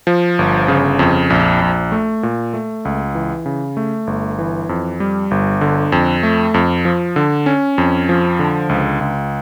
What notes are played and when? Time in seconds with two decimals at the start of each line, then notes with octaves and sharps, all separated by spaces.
0.07 F3
0.39 G1
0.68 C#3
0.99 F2
1.30 A#1
1.62 A#1
1.92 A3
2.23 A#2
2.54 A3
2.85 C#2
3.15 E3
3.46 C#3
3.77 A3
4.07 G1
4.39 E3
4.69 F2
5.00 G3
5.31 G1
5.61 D3
5.92 F2
6.23 A3
6.54 F2
6.85 F3
7.16 D3
7.46 C#4
7.78 F2
8.09 F3
8.39 D3
8.69 C#2
9.01 C#2